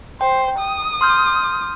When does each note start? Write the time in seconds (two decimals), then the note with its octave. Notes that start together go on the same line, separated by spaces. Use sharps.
0.21 C5 G5
0.59 D#6
1.01 C6 F6 G6